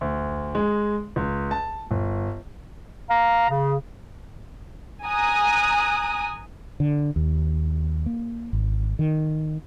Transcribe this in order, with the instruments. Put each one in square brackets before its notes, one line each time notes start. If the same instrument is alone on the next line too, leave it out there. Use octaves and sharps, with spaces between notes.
[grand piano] D2
G#3
C#2
A5
G1
[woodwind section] F5 A#5
C#3
[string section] G#5 A#5 D#6 F#6
[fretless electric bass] D3
D#2
A#3
G#1
D#3